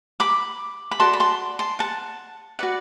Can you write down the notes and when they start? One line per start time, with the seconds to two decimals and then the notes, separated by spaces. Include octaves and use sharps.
0.20 B5 D6
0.91 B5
1.00 F#4 A4 D5 A5 C6
1.13 B5
1.20 A5 C6
1.59 A5 C6
1.79 F#5 A5
2.59 F#4 B4 D5 F#5